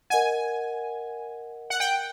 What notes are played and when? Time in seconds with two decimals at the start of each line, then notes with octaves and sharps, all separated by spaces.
0.10 A#4 D#5 F#5 G#5
1.70 F#5
1.80 G5